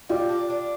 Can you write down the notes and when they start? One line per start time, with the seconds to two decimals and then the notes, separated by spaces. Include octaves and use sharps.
0.09 G3 F4
0.29 D4
0.50 D4